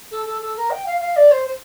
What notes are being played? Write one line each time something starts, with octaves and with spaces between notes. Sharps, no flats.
A4
A4
A4
A#4
G5
F5
F5
D5
C5
C5